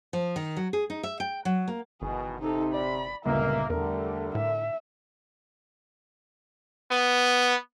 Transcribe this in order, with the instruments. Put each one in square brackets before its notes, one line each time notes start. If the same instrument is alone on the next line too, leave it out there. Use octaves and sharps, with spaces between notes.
[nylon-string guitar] F3
D#3
F#3
G#4
D#4
E5
G5
F#3
A#3
[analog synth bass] G1 [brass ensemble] B2 D#3 E3 [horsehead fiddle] G#4
[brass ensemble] C3 [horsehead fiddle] D#4 A4
[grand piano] D5 [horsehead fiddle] B5
[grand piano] G1 C#2 A#2 [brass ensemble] A#3 [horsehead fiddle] E5
[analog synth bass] E2 [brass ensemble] D3 [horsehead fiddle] G3 A3 [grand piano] A#4
[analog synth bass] A2 [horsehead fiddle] E5
[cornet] B3